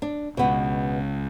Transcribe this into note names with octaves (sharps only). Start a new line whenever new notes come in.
D4
C#2 B2 B3